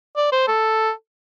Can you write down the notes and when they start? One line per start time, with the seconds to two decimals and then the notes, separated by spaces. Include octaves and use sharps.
0.17 D5
0.32 C5
0.48 A4